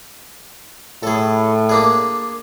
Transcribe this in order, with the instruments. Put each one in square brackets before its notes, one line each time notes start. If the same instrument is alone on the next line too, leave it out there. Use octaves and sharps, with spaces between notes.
[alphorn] A2 [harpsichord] G#4 A4
[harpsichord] A#3 D4 G#4